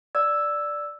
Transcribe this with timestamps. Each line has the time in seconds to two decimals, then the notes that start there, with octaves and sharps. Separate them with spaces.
0.15 D5 E6 G#6